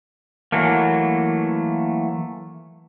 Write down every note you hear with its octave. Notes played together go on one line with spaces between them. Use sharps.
E3 F#3 A3 A#3